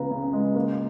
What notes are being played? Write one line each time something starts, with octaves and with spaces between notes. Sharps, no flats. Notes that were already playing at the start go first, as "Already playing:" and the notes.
Already playing: C#2 B3 A#5
C#3
G#3
A#3